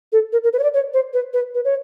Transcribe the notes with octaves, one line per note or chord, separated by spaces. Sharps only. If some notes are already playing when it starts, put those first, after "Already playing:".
A4
A#4
A#4
B4
C#5
D5
C#5
C5
B4
B4
B4
C#5